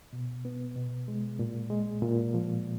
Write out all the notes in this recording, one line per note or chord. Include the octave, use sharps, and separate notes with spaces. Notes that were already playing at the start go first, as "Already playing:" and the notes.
B2
B3
B2
G#3
A#2
G#3
A#2
F3